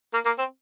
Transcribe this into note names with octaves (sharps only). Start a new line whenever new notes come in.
A#3
A#3
C4